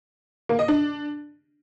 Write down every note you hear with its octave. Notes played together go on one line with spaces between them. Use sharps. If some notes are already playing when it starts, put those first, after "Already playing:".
A#3
D#5
D4